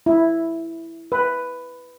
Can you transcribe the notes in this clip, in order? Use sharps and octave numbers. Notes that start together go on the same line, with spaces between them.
E4
B4